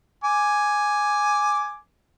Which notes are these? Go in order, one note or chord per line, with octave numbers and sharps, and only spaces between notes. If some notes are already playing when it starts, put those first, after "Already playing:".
G#5 D6